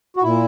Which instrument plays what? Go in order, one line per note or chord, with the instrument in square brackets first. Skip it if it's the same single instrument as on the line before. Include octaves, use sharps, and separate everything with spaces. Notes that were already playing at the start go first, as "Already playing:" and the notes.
[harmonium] F#4
A#2 E4